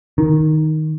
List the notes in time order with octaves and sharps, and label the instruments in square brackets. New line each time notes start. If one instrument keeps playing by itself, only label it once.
[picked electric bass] D#3